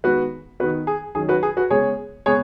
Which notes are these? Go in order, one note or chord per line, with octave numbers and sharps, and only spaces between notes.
D#3 G#3 B3 F#4 B4
D#3 B3 F#4 B4
G#4
D#3 F#3 C#4 G#4
F#4 B4
G#4
F#4 B4
C#3 G#3 B3 G#4 C#5
C#3 G#3 B3 G#4 C#5